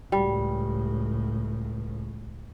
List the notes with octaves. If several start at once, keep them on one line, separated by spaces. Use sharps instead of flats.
C#2 A2 G3